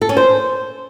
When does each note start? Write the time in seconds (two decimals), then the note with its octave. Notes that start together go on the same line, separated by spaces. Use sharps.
0.02 A4
0.09 C#4
0.17 C5